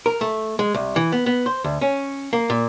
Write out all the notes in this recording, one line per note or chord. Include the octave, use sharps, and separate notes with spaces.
A#4
A3
G#3
C2
E3
B3
B3
C5
D2
C#4
A#3
A#2